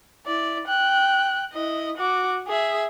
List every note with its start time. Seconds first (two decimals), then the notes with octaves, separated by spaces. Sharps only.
0.26 E4 D5
0.67 G5 F#6
1.53 E4 D#5
1.97 F#4 D6
2.47 G#4 E5